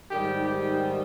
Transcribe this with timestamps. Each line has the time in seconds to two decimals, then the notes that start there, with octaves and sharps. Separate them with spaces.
0.11 G#2 D#3 G3 G4
0.44 G4